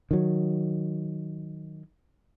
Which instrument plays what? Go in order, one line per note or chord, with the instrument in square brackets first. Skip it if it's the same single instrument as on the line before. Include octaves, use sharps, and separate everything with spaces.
[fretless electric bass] D#3 F#3